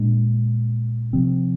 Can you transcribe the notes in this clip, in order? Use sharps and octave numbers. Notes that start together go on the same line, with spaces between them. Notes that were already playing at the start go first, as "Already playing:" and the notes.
Already playing: A#2 G#3 D4
C3 F3 C4